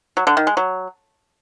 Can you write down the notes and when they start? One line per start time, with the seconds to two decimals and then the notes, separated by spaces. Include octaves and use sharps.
0.17 F#3
0.27 D3
0.37 D#3
0.47 G#3
0.57 F#3